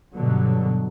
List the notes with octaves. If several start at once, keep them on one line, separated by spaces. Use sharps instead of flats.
G2 B2 D3 F#3